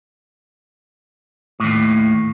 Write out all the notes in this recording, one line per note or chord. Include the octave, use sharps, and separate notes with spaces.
D#2 A2